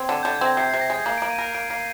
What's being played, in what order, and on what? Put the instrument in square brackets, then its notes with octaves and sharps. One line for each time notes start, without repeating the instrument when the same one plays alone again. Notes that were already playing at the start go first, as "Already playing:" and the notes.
Already playing: [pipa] C4 [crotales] G#6
[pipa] D3
[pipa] D3 [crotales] G6
[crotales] G#6
[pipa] C4 [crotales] A#6
[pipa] C3 [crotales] C7
[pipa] C3 [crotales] C7
[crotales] A#6
[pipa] G#3 [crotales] G#6
[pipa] A#3 [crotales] C7
[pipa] A#3 [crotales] D7
[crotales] D#7
[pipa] A#4 [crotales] D7
[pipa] A#3 [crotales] D7
[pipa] A#3 [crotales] C7